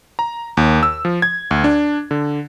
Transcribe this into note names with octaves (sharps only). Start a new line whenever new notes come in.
A#5
D#2
E6
F3
G#6
D2
D4
D3